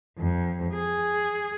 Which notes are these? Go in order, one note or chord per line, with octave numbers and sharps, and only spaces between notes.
F2
G#4